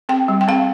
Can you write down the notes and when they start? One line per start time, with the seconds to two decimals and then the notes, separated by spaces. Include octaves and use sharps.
0.09 C4 G5
0.28 G3
0.41 G5
0.48 C4 F5